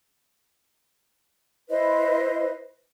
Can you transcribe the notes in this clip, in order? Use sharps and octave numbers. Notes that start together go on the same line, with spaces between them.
E4 B4 C5 D#5